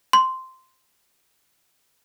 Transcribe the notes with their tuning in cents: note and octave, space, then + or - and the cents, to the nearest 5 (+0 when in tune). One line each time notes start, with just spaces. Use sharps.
C6 -10